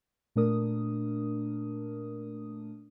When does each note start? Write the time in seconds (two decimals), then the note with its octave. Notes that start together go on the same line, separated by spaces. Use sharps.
0.36 A#2 A3 D4 A#4 D#6